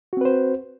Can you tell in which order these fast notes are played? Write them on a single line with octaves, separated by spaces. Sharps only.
F#4 C4 B4 C5